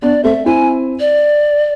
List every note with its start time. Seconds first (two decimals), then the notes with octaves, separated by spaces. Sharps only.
0.02 B3 D4 D5
0.24 A3 C4 E5
0.46 C4 E4 G#5
1.00 D5